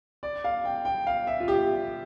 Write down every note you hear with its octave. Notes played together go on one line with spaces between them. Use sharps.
D5
F5
G5
G5
F5
E5
F4
G4